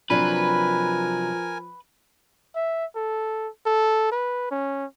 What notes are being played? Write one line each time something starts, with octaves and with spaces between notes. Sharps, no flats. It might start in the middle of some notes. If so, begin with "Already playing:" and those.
C3 F3 F#3 D4 A#4 B4 G#5
E5
A4
A4
B4
C#4